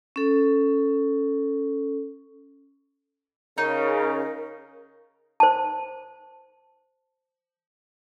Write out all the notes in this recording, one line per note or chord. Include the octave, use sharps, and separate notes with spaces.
C#4 A4
C#3 D#4 A#4
C5 A5